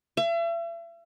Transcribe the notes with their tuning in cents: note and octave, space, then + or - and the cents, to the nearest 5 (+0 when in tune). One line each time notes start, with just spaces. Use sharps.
E5 +40